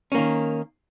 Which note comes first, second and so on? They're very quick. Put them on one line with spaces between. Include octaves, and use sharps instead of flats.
C#4 A#3 D#3